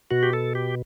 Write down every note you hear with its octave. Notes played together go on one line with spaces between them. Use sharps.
B2 F#4
G4
A4
G4